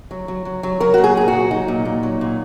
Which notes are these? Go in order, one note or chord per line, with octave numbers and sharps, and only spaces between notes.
F#3
F#3
F#3
F#3
F#3 A#4
A#2 F#4
G#4
A#2 G#4
F#4
F#3
F#3 D#4
A#2
A#2
F#3
A#2